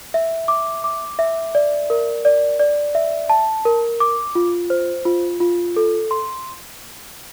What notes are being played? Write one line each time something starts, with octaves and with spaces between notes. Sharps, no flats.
E5
D6
D6
E5
D5
A#4
D5
D5
E5
A5
A#4
D6
F4
C5
F4
F4
A4
C6